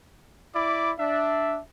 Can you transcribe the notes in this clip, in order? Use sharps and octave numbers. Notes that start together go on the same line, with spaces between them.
E4 D5 B5 D6
D4 E5